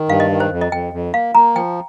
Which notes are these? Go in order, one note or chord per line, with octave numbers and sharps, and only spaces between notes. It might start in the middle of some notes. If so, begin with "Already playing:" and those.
Already playing: D#3
G2 F5
D#5
D#3
C5
F2
D#5
F2 G5
F2
A#3 F5
A#3 A#5
F3 G5